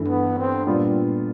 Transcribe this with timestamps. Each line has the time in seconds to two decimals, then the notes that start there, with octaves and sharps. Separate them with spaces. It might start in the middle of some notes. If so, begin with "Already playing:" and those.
Already playing: G2 E3 A3
0.08 B3
0.38 C4
0.67 A#2 G3 B3 D4 F4